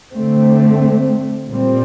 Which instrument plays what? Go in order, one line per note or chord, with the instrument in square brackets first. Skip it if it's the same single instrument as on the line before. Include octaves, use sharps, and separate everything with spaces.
[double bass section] D3 A3 C4
A#2 G3 C4